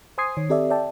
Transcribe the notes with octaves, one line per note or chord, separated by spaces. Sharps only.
C5 G#5 C6 D#6 G#6 C7
D#3 C#5
C4 G4 A4 D5 E5
D5 E5 G5 A5